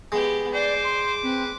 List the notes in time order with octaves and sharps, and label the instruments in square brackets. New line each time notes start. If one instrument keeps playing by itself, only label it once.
[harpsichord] G#3 [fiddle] B3 G4
[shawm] C5 [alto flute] D5 [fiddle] D6
[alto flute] C6
[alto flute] C4 [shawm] B4